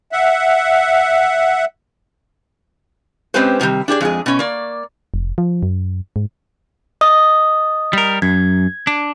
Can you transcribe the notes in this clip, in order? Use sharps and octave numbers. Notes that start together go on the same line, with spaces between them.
E5 F#5
G#3 C4 C#4 G4 B4 C5
A2 C3 D#3 G3
D4 G4 G#4 D5
F2 G#3 G#4
B2 C#4
A#3 D5
F1
F3
F#2
G#2
D#5 D#6
G3 A#4
F#2 G#6
D4